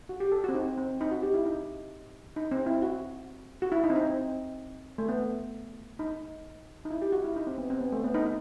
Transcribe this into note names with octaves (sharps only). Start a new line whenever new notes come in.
F#4
G4
A4
C4 F#4
D#4
C4
D#4
F#4
G4
E4
D#4
D#4
C4
E4
F#4
F#4
E4
D#4
C4
D#4
C4
A3
B3
D#4
D#4
E4
G4
F#4
E4
D#4
C4
B3
C4
B3
A3
B3
D#4
D#4